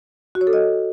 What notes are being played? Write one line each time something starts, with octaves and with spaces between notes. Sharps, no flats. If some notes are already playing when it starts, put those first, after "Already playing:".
F#4
C#5
A4
D#5